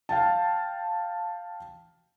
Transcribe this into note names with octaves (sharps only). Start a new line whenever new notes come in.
F5 G5 A5